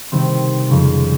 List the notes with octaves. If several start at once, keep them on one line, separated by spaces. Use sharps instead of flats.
C3 D#3 G3 C4
F2 C#3 G#3